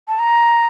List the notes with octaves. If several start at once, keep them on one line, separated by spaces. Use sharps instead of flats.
A5
A#5